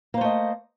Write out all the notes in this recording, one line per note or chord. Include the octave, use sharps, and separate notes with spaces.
A3 A#3 C5 D#5